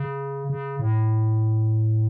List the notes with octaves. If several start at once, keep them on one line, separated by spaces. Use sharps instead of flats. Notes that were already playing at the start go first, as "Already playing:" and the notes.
Already playing: C#3
C#3
A2